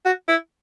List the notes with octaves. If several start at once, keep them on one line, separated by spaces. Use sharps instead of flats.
F#4
E4